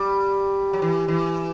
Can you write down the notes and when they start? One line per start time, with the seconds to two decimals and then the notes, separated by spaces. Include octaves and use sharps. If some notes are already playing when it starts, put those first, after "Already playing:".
Already playing: G3
0.73 F#3
0.82 E3
1.08 E3